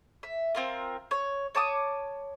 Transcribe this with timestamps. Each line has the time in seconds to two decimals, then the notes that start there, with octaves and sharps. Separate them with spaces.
0.23 E5
0.55 C4 F4 A#4
1.11 C#5
1.55 C#5 A5 D6 D#6